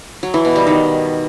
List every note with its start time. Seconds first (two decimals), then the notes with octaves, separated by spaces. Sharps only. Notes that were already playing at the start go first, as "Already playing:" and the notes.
0.23 F#3
0.34 E3
0.45 B2
0.56 G3
0.67 D#3